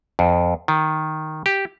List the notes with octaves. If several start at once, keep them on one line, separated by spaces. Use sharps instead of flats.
F2
D#3
G4